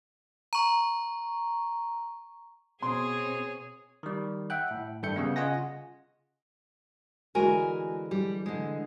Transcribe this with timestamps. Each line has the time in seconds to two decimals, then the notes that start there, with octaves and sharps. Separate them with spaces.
0.53 A#5 C#6
2.82 B2 C4 G#4 C#5 C6
4.03 D#3 G3
4.50 E5 F#5 G5 F#6
4.71 A2
5.03 G2 D#3 A4 E5 G6 C#7
5.16 C#3 G3 B3
5.36 C#3 F4 D#5 F#5 G#5 A#6
7.35 D3 E3 G#3 F#4 A#4 G#5
8.11 G3
8.46 D3 G#3